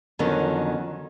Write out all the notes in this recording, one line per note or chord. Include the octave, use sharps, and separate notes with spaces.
F2 D3 D#3 F#3 B3 C#4